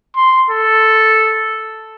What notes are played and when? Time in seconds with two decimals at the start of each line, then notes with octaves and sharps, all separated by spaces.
0.16 C6
0.50 A4